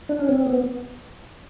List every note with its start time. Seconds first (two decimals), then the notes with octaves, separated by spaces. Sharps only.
0.09 D4
0.19 C#4
0.29 C4
0.47 B3